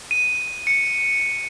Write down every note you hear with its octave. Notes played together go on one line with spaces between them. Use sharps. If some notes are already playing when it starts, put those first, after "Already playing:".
D#7
C#7